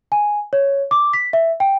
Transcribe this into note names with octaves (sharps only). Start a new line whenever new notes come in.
G#5
C#5
D6
B6
E5
G5